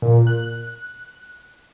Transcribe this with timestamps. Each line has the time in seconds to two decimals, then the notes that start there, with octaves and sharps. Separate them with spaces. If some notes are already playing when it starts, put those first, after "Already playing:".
0.02 A#2
0.27 F#6